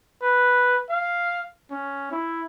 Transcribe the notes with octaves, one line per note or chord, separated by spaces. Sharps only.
B4
F5
C#4
E4